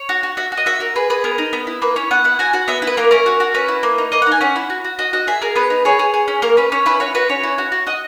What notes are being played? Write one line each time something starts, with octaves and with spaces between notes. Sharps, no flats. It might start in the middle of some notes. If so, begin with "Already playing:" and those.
Already playing: C#5
F#4
F#4
F#4 E5
F#4
D#5
F#4 E5
F#4 A#4
G#4 B4
G#4 B4
B3 A#4
D#4
B3
E4
A#3 B4
C#4 C#5
B3 F#5
E4 F#5
F#4 G#5
F#4 F#5
B3 E5
E4
B4
A#3 A#4
C#4 A#4
F#4
F#4
C#4 B4
E4
A#3
D#4
A#3 D#5
F#5
D#4
G#5
C#4 F#5
E4
F#4
F#4
F#4 D#5
F#4 D#5
G#4 E5
G#4 A#4
B3 B4
D#4
G#4 C#5
G#4
G#4
C#4
A#3 A#4
C#4 B4
C#4 C#5
E4 B4
F#4 C#5
F#4 B4
C#4 C#5
E4
F#4
F#4
F#4 D#5